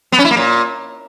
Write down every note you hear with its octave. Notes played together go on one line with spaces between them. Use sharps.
B3
C#4
E4
A#3
A#2